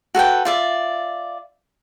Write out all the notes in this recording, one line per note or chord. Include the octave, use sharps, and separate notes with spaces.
F#4 A4 B4 G5
F4 D5 E5